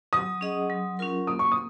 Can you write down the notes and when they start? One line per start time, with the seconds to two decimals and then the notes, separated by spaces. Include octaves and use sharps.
0.13 F#3 D#6
0.41 C#4 G#4 D#5 F#5
0.70 F#3
0.99 C#4 F4 A#4
1.27 A#3 D#6
1.39 C#6
1.52 D#6